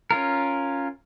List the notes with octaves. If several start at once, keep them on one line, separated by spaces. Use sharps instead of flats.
C#4 F4 A#4